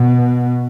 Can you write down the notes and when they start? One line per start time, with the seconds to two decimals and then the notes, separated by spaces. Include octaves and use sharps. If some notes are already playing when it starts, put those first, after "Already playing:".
Already playing: B2